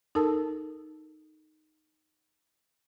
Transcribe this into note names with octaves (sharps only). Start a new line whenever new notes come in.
D#4 A4 A#4 A5 E6